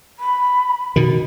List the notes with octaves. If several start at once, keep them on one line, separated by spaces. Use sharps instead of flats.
B5
B2 D#3